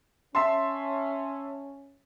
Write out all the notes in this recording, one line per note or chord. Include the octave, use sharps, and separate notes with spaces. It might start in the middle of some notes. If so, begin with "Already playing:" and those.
C#4 E5 A5 C6